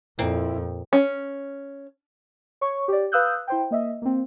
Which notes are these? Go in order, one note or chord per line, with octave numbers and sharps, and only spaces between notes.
F2 A#2 C4 E4
C#4
C#5 C#6
G4 D5
B4 F5 D#6 E6 F#6 G6
E4 C5 G5
A#3 D#5 E5
A#3 C4